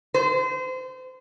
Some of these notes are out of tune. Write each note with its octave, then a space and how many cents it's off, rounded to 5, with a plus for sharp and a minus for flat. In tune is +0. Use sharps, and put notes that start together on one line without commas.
C5 -30